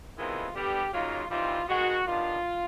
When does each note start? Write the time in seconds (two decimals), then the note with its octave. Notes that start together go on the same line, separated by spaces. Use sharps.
0.16 C3 D#3 G#3 B3 E4 F4
0.54 G2 D3 G3 B3 G4
0.92 C#3 F#3 A#3 D#4 F4
1.30 E3 G3 C4 D#4 F4
1.68 D#3 G#3 B3 F#4
2.05 D#3 G3 B3 D4 F4